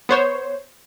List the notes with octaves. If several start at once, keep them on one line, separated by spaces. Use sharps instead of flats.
B3 C5 C#5